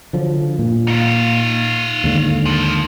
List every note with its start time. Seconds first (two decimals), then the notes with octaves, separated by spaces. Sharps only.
0.13 D3 F3 F#3
0.59 A#2
0.88 D#4 F4
2.04 D#2 G#2 D3
2.46 F3 A#3